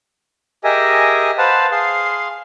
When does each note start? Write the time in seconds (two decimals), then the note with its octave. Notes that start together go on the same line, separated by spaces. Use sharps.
0.64 G4 G#4 A#4 D#5 E5 G#5
1.38 B4 C5 F5 F#5 A5
1.72 G#4 F5 C6